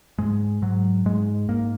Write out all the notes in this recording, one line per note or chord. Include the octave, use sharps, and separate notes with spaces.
G#2 G#3
G#2 F#3
G#2 G#3
G#2 A#3